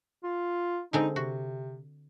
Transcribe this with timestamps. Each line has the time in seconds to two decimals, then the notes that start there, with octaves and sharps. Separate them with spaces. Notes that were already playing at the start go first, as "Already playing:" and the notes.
0.23 F4
0.93 D3 G#3 C4 D#4
1.16 C3 F#4